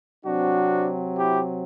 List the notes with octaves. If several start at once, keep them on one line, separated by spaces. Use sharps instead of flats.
C3 F#3 C4 D4 F#4
E4 G4